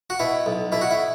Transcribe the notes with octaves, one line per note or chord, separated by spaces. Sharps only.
F#4
B2 E4
B1
B2 E4
F#4
E4